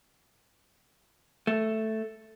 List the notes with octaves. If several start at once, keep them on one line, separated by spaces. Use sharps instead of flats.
A3